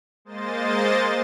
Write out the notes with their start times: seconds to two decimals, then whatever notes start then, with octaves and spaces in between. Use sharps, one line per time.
0.25 G#3 A#3 C5 D#5 A6